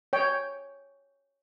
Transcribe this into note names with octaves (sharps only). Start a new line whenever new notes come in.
C#5 G5